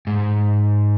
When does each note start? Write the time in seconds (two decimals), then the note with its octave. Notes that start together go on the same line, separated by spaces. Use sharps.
0.07 G#2